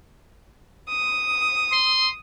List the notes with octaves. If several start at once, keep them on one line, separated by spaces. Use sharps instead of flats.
D#6
C6